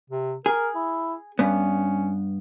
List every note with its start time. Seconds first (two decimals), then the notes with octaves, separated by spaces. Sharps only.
0.10 C3
0.46 G#4 A#4
0.75 E4
1.39 G2 B3 C#4